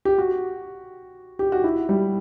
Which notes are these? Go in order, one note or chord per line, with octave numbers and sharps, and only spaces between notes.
G4
F#4
G4
F#4
E4
G3